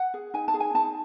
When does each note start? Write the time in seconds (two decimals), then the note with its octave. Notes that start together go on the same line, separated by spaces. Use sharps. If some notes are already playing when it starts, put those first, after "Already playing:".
Already playing: F#5
0.14 G#4
0.34 D#4 G#5
0.48 A5
0.54 G#4
0.60 G#5
0.74 D#4 A5